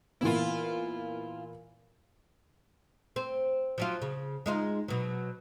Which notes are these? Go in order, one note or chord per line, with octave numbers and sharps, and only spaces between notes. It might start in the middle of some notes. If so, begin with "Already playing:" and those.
A#2 E3 B3 E4 F4
C4
F3 F#3 F4
C#3
G#3 D#4 F4
B2 F#3